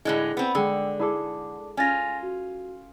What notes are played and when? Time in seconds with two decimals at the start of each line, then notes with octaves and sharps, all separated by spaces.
0.05 A2 D3 G#3 E4 G#4 F#6
0.37 B3 C4
0.55 D3 G#3 G#4 G5 E6
0.99 E4 G#4 A4 D5 A5 D6
1.77 C#4 F4 G#5 A6 A#6
2.23 F#4